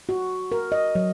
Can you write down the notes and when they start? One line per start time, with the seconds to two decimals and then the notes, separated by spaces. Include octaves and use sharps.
0.09 F#4
0.52 A#4
0.72 D#5
0.95 F#3